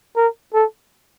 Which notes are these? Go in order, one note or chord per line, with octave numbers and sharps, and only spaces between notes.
A#4
A4